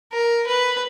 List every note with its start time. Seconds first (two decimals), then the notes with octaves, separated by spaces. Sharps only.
0.13 A#4
0.47 B4